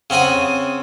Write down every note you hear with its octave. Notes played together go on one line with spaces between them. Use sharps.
C#3 C4 F#5 G#5 D#6